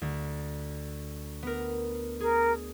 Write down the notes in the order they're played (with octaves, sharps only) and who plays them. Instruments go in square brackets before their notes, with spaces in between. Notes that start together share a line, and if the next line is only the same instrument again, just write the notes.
[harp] D2
B3 A#4
[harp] G#4 [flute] A#4